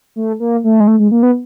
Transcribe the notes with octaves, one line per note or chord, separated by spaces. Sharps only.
A3
A#3
A3
G#3
A3
G#3
A#3
B3